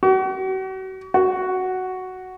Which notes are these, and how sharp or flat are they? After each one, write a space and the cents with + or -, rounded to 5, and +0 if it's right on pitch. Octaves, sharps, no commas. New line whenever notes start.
F#4 +40
F#4 +5